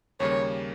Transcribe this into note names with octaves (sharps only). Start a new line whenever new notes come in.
D#2 C#3 G3 A#3 C#5